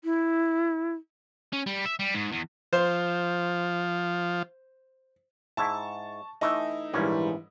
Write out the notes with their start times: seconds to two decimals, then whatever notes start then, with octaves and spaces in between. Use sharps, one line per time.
0.04 E4
1.53 C#4
1.66 G3
1.86 E5
1.99 G3
2.14 G#2
2.32 E2
2.73 F3 C5
5.57 G#2 E4 A5 C#6
6.41 E3 A3 D#4 E4
6.94 A#1 G#2 E3 G3 A#3 C#4